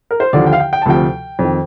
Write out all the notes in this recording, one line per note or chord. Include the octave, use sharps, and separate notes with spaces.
A#4
C5
D#2 D3 F3 D5
G5
F5
G5
G5
A5
D2 C3 F3 G5
F2 D#3